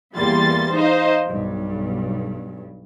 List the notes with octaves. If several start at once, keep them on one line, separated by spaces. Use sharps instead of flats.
E2 E3 G3 A#3 C6 A6
D#4 C5 D#5 F5
B1 G2